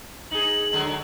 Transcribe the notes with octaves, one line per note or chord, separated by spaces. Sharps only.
D#4 G#4 F#7
D3 F#3 G#3